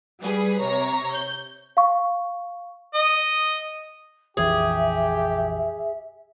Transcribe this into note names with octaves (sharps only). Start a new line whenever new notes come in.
G3 G#4 B4
C3 C#5 A#5
G6
F5 C#6
D#5
A#1 F2 E3 G4 G#4 E5